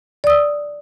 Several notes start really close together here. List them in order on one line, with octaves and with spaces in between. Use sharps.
D5 D#6 E6